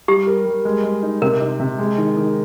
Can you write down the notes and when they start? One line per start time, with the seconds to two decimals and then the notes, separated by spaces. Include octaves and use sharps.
0.08 G3 G4
0.27 A#4
0.46 G3
0.65 G#3
0.83 G#3
1.03 D#4
1.22 C3 A#4
1.41 D#4
1.60 C3
1.78 G#3
1.98 D#3
2.17 D#3